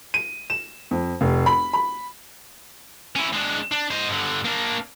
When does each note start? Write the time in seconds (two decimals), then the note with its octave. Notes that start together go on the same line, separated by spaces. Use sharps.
0.14 D#7
0.50 E7
0.91 F2
1.21 F1
1.46 B5
1.73 B5
3.16 C#4 E4
3.33 G#3 D4
3.72 D4
3.91 C5 D#5
4.09 G2 D3
4.45 A#3 D4